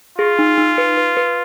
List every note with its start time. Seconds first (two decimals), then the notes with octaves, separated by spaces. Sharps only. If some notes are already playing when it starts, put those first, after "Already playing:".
0.18 F4 G#4
0.39 D#4
0.58 D#4
0.78 B4
0.97 B4
1.17 B4